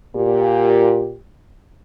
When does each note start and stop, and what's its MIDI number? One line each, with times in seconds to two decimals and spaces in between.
0.16 1.17 46
0.16 1.17 67